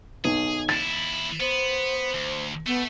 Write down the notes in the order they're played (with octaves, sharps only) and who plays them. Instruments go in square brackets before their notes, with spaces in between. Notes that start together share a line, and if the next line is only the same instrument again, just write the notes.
[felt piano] B1 [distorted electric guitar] G#4
[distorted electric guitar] D#2 E4 [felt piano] A6
[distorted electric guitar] B3 [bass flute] C5
[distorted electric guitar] D2
[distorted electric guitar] A3 [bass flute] B3